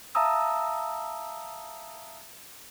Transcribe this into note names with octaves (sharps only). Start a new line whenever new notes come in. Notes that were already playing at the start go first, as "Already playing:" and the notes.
E5 F5 A5 A#5 D#6 E6